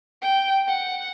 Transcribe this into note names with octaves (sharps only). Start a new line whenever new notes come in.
G5
F#5